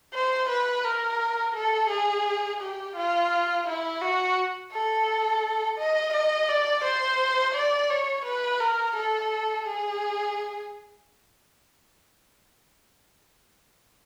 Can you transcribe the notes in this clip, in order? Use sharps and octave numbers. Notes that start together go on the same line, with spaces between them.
C5
B4
A#4
A4
G#4
G4
F4
E4
F#4
A4
D#5
D#5
D5
C5
D5
C#5
B4
A#4
A4
G#4